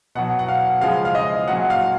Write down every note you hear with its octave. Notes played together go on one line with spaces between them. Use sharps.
B2 F#3 F#5
F#5
F5
C#3 F3 G#3 F5
F5
D#5
A#2 F#3 F#5
F5